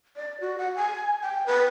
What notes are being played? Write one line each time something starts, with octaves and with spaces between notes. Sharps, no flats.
D5
F#4
F#5
G#5
G5
B4